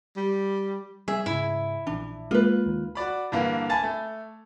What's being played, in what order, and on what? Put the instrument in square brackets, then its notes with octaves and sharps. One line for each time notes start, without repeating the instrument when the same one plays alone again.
[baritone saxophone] G3
[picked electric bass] G3 C4 [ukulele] G#4 [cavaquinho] E5
[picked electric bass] G#2 C#3 [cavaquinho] E4
[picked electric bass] A#1 E3 [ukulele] D4
[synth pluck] G#3 A#3 [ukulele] F4 B4
[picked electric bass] D#2 D#3
[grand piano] F#4 D5 B5
G2 D3 E3 A#3
G#5 A5 B5 A6
A3